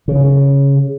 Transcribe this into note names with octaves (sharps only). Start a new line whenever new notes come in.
C#3